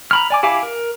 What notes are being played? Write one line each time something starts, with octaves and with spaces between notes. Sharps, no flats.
A#5 B5 F6
D5 G#5 D6
E4 G4 F5 G#5 D6
A#4